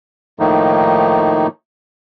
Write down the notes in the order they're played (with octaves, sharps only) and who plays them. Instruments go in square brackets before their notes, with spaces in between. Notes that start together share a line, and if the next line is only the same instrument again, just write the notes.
[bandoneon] A2 D#3 F3 A3 A#3 D#4